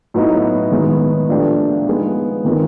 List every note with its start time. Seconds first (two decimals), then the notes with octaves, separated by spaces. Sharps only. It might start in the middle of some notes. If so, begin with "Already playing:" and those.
0.14 A2 F#3 B3 D#4
0.71 D#3 G#3 B3
1.29 A#2 F3 A3 D4 G4
1.86 F3 G#3 B3 D#4 G#4
2.45 D#3 G#3 C4 F4 A#4